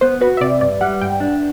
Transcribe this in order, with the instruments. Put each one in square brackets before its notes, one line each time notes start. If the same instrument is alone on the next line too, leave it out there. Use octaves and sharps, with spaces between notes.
[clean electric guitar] B3 [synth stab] C5
[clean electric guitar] F#4 [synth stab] B4
[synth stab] E5
[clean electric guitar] C3 [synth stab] D5
[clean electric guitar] G2 [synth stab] D5
[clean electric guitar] G3 [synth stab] F#5
[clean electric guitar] G2 [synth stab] G5
[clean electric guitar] D4